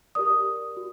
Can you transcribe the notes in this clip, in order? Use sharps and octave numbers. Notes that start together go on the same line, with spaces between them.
G4 A#4 D5 D#6
F#4